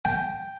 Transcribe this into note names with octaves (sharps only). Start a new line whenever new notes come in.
G5